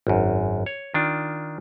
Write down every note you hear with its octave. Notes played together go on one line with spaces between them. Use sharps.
G#1 F#2
C#5
D#3 D4 F4